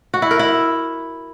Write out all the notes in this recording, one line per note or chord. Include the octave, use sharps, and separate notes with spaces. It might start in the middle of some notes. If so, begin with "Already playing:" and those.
F#4
E4
A#4
E4